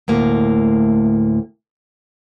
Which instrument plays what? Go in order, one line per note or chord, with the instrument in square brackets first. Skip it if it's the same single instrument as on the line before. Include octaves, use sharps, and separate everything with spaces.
[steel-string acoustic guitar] D2 A2 A#3